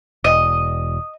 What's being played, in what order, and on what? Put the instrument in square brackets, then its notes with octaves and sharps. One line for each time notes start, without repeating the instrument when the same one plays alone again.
[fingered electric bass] E1 [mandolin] D#5